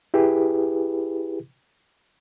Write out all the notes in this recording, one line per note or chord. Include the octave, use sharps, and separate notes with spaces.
E4 G4 G#4 B4